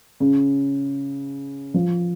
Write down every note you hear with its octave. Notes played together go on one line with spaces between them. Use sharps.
C#3
F3